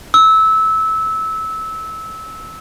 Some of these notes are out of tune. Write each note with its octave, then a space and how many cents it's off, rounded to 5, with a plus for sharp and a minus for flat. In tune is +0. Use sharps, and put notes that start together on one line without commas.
E6 -20